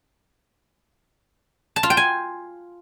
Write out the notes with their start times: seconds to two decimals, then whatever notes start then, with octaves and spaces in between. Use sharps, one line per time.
1.76 A5
1.83 F4
1.90 G5
1.97 G#5